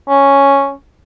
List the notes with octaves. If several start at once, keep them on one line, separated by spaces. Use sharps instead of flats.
C#4